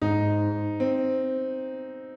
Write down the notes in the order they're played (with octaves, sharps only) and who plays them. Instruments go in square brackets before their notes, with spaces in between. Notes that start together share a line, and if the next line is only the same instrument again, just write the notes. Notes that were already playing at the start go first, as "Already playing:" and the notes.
[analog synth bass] G#2 [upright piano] D#4
[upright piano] C4